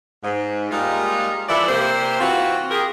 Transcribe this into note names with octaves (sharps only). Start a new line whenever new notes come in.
G#2
G3 G#3 A#3 D#4 F4
E3 F3 D4 E4 A4 D5
C3 A#3 C5
E3 C4 F4 F#4
G4 G#4 A#4